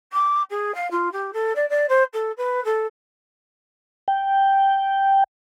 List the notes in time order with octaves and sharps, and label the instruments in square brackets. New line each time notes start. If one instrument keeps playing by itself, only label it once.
[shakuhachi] D6
G#4
F5
F4
G4
A4
D5
D5
C5
A4
B4
A4
[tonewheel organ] G5